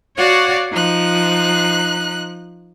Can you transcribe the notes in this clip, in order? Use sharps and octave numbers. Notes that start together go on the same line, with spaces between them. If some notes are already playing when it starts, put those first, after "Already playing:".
F#4 C#5 D5 F5 F#5
F3 D#4 F#6